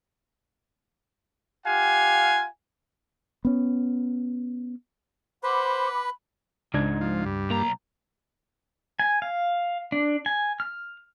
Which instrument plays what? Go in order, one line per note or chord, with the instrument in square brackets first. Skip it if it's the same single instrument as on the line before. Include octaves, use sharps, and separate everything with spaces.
[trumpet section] F4 G4 F5 F#5 G#5
[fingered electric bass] B3 C#4
[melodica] B4 [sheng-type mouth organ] C5 [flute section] F#5 D6 [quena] B5
[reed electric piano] C#2 D4 G#6 [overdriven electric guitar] G#2
[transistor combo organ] F3
G2
[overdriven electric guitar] B1 A#5 [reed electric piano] A#3
[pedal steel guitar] G#5
F5
D4
G#5
F6